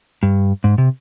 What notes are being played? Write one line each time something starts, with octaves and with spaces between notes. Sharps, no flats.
G2
G#2
C3